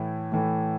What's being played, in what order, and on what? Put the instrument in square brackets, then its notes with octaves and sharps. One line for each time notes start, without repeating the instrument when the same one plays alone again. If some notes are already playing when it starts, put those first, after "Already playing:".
Already playing: [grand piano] A2 E3 A3
A2 E3 A3